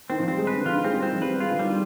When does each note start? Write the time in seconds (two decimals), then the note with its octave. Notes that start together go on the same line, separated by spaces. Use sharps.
0.10 D#3 C4
0.19 F3
0.28 G3 C4
0.37 G#3
0.47 B4
0.56 D3
0.66 F3 F4
0.75 D#3
0.84 G#3 C4
0.94 G3
1.03 D#3 C4
1.12 F3
1.22 G3 B4
1.32 B3
1.40 G#3 F4
1.50 D3
1.59 D#3 G3